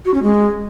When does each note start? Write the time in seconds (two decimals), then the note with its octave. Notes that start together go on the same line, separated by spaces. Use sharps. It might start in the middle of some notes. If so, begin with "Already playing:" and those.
0.05 F#4
0.14 C#4
0.23 G#3